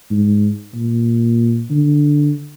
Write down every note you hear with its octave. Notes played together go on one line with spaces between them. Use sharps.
G#2
A#2
D3